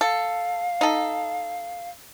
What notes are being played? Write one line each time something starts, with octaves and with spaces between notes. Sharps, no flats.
A4 F5
D#4 A4